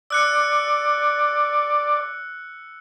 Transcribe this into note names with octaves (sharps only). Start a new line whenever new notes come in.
D5 E6 F#6 C#7